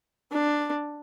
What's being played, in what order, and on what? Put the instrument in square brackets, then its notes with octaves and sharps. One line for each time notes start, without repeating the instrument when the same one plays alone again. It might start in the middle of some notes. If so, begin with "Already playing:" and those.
[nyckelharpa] D4